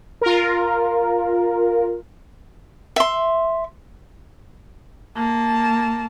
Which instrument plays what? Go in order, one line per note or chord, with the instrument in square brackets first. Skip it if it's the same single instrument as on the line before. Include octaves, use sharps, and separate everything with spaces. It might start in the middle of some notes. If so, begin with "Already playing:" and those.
[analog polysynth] F4 A#4
[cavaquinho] E5 C6
[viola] A#3 A5